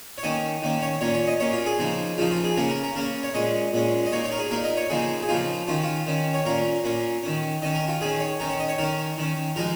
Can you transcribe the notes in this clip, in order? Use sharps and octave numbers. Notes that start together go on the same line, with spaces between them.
C#5
D#3 A#3 C#4 D#5
D#3 A#3 C#4
C#5
A#2 A#3 C#4 C#5
C#5
D#5
A#2 A#3 C#4 C#5
F4
G#4
C#3 F3 A#3 D#4
C#3 F3 A#3 D#4 F4
F4
G#4
C#3 A#3 C#4 A#4
A#4
A#4
C#3 A#3 C#4 A#4
C#5
A#2 G#3 C#4 D#5
A#2 G#3 C#4
D#5
A#2 A#3 D#4 C#5
C#5
A#4
G#4
A#2 A#3 D#4 A#4
D#5
C#5
C#3 F3 A#3 D#4 G#4
G#4
C#3 F3 A#3 D#4 F4
D#3 C#4 F4
F4
D#3 C#4
C#5
A#2 A#3 C#4 A#4
A#2 A#3 C#4
D#3 C#4
D#3 C#4 D#5
A#4
F4
D#3 C#4 G#4
C#5
D#3 C#4 A#4
C#5
D#5
C#5
D#3 C#4 A#4
D#3 C#4
F3 G#3 D#4 A#4